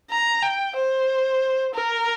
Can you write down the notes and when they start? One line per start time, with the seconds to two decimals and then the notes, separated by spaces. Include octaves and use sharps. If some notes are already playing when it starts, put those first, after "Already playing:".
0.10 A#5
0.42 G5
0.75 C5
1.74 A#4